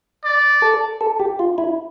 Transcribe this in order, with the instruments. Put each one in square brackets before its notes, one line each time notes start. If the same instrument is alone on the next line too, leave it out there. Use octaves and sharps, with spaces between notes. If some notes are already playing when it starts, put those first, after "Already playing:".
[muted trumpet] D5
[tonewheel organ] A4
A4
G4
F4
E4